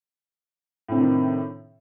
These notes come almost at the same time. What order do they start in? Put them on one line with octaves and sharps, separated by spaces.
A2 C4 C3 D4 D#3